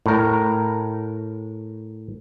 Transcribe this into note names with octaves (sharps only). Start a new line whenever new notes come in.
A2 A#4